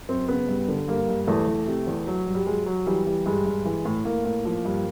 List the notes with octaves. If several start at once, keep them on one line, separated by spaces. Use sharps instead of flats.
F#2 C4
C#3 B3
G2
D3
G2 A#3
G2
E2 A3
E2
C3
E2
F#3
G2
G3
F#3 G#3
F#3
E3 G3
E3 G3
G2 G#3
G2
E3
A2
A2 A#3
A2
F3
G2